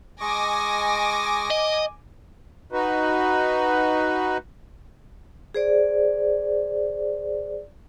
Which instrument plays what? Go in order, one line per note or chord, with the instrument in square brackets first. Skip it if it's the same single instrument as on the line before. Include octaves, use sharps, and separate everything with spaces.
[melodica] G#3 D#5 C#6 [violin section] G#5 D6 A#6
[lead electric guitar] D#5
[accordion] D#4 F#4 B4
[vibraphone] G#4 C5 D5